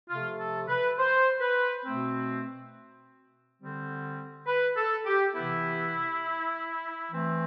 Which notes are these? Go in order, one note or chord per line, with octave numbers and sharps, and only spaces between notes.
C3 F3 A3 F4
A4
B4
C5
B4
B2 A3 C4
D3 G3 C4
B4
A4
G4
C3 E3 B3 E4
E3 A3 C4